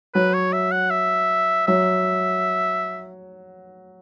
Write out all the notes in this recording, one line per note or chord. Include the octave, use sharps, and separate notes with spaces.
F#3 B4
C#5
E5
F#5
E5
F#3 E5